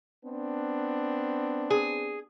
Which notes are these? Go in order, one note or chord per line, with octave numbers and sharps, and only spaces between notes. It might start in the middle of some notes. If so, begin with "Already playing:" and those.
B3 C4 D4
G#4